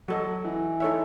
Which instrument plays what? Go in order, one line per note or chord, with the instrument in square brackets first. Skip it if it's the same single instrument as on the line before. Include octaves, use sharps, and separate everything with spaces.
[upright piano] F#3 [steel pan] F#4 A4 D#5
[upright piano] E3
[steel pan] D#4 A4 C#5 E5